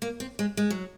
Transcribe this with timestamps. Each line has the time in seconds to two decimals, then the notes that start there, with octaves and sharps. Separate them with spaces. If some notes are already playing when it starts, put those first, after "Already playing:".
0.02 A#3
0.20 C4
0.39 G#3
0.57 G#3
0.71 F#3